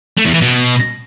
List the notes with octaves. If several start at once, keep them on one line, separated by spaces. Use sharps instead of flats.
A3
E2
E3
B2